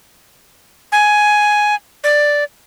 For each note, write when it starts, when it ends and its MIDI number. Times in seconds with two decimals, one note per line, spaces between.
0.92 1.75 80
2.04 2.44 74